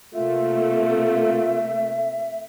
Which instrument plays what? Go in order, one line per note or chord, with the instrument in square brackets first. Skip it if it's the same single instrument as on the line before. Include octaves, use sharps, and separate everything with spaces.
[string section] C3 A3 A#3 [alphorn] F4 [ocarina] E5